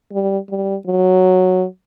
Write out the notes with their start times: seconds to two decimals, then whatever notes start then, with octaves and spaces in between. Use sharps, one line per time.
0.12 G3
0.49 G3
0.87 F#3